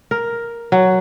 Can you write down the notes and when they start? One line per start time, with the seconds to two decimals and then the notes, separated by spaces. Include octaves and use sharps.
0.11 A#4
0.72 F#3